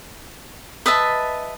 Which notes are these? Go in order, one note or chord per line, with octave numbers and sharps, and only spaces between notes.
B4 D#5 E5 A5